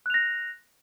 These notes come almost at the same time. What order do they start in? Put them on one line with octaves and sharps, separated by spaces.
F#6 F7 A#6